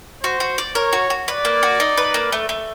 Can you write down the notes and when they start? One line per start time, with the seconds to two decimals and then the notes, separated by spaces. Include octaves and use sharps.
0.23 F#4 C5
0.40 F#4
0.58 D5
0.75 A#4 C#5
0.93 F#4
1.10 F#4
1.28 B4 D5
1.45 A#3
1.63 F#4
1.80 D#4
1.97 B4
2.14 A#3
2.32 A3
2.49 A3